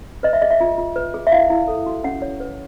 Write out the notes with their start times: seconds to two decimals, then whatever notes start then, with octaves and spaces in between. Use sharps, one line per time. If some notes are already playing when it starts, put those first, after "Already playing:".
0.23 B4 D#5
0.33 E5
0.42 G#4 D#5
0.51 E5
0.60 F4
0.78 F4
0.96 B4
1.14 G#4
1.27 E5
1.32 E4 F5
1.50 E4
1.68 A4
1.86 F#4
2.04 C#4 F#5
2.22 C#5
2.40 B4